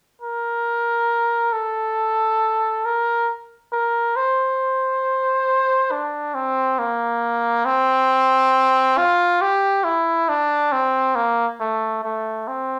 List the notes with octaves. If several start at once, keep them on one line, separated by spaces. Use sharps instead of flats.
A#4
A4
A#4
A#4
C5
D4
C4
A#3
C4
F4
G4
E4
D4
C4
A#3
A3
A3
C4